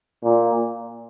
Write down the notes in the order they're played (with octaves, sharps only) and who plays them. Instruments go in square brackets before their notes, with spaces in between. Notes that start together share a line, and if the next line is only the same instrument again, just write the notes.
[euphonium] A#2